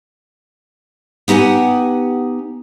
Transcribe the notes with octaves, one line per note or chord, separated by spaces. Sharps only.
B3 D#4 G4 F#5 G#5